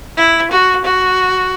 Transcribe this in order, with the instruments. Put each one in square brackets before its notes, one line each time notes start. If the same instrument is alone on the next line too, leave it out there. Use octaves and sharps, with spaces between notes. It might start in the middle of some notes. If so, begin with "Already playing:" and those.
[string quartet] E4
F#4
F#4